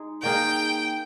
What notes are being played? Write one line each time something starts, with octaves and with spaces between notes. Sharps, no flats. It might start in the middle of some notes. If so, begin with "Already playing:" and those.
Already playing: G#3 D#4 G#4
D#3 A#3 D#4 G#4 G5